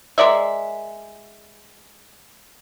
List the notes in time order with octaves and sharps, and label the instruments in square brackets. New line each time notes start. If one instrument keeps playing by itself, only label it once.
[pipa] G#3 A#4 D5 E5